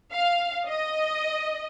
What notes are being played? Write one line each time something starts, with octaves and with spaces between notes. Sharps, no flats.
F5
D#5